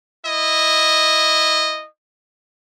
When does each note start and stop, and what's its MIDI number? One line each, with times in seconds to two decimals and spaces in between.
0.24 1.86 64
0.24 1.86 75